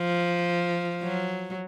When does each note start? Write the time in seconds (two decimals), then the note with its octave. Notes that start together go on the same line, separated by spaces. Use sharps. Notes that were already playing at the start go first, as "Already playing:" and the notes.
Already playing: F3
1.03 F#3